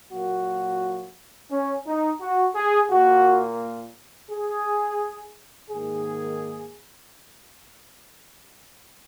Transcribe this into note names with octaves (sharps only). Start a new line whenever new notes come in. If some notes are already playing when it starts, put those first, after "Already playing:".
A#2 F#3 A#3 F#4
C#4
D#4
F#4
G#4
A#2 A#3 F#4
G#4
G#2 D#3 A#3 G#4